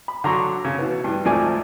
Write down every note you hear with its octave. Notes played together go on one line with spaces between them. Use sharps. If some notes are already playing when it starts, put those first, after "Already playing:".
B5
D3 F#3 A#5 C6 C#6
C#3
B2 E3 B3
G2 E3
D2 G#2 F3 A3 D5 G#5